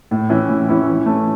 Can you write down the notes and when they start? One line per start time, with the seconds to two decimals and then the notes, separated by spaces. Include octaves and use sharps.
0.11 A2
0.29 E3 C#4 E4
0.49 A2
0.68 E3 C#4 E4
0.88 E3
1.06 A3 C#4